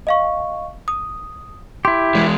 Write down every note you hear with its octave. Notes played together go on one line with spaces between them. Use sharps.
D#5 F5 C#6
D#6
E4 G4 C6
E2 G#3